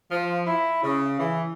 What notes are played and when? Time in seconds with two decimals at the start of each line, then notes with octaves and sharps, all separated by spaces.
0.11 F3
0.46 E4
0.83 C#3
1.20 E3